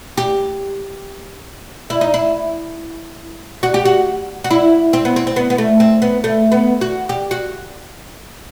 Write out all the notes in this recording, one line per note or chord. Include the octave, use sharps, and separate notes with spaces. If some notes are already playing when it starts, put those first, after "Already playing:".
G4
E4
D#4
E4
F#4
G4
F#4
F#4
E4
C4
B3
C4
C4
B3
B3
A3
C4
B3
A3
B3
F#4
G4
F#4